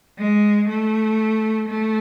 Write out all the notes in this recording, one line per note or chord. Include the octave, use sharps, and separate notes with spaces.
G#3
A3
A3